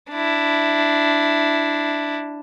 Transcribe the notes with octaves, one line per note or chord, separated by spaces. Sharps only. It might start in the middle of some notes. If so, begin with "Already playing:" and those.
D4 E4